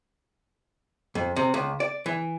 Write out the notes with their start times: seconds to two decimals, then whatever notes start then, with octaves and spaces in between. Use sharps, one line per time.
1.15 F2
1.36 C3
1.54 C#2
1.80 D5
2.06 E3